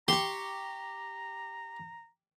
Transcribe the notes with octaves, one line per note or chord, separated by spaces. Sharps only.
G4 A#5 C6 C#6